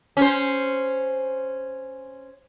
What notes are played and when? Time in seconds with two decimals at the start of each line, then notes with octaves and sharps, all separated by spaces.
0.17 C#4 C5